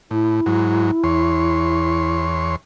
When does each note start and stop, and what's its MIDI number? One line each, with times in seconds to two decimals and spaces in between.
0.11 0.40 45
0.11 2.25 64
0.46 0.91 44
0.46 0.91 54
1.04 2.56 40
1.04 2.56 73
1.04 2.56 84